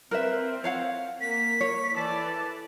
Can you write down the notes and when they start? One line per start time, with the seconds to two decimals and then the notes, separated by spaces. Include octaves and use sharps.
0.11 C4 A#4 B4 E5
0.64 C#5 F5 F#5
1.21 A#3 B6
1.61 C#5
1.95 E3 A4 D5 A5